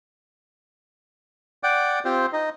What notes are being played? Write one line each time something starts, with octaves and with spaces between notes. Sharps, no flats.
D5 F#5 G5 D6
C4 F4 G4 C5
D#4 D#5